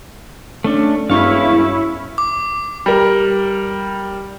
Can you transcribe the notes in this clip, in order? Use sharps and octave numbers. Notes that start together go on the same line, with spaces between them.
A3 C#4 D4
E1 G2 C#4 E4 F5 C#6
D6
G3 A#4